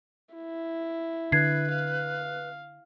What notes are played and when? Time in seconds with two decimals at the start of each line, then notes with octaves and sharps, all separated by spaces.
0.34 E4
1.32 D3 B4 G#6 C7
1.71 F5